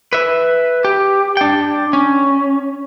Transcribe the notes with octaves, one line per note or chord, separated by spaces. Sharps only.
B4 E5
G4
D4 G5
C#4